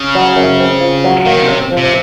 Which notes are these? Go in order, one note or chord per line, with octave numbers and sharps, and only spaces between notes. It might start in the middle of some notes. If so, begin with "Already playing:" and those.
Already playing: C#3
F#3
F#2
C4
F4
F#3
D#3 A#3
C3 C#4
F3
C3